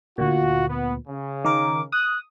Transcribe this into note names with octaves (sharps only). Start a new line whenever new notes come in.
D2 A#2 F4 F#4
B3
C#3
D#3 A#4 D6
D#6 F#6